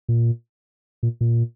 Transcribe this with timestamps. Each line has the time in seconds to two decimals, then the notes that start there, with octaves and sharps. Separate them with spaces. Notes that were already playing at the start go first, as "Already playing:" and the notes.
0.09 A#2
1.03 A#2
1.21 A#2